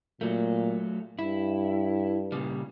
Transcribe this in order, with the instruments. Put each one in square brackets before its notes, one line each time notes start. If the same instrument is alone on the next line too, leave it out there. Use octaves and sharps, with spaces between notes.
[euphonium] A#2 [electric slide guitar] F#3 A3
[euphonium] G2 [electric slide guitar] E4
[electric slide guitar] A#2 C#3 G3